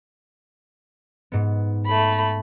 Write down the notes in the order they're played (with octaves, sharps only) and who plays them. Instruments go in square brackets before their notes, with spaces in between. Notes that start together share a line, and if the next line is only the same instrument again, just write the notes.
[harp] G#2 B3
[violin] A3 B5